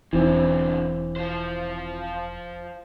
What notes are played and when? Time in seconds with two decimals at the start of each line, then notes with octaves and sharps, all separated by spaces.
0.13 E1 F#2 D3 E3 C4 E4
1.16 F3 C5